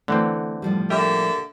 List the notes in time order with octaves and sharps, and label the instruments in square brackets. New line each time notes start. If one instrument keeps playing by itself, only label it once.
[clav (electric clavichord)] D3 E3 C4 [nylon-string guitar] A3 B3
[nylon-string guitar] A2 F3 G3
[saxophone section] D3 A#3 E5 [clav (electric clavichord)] G4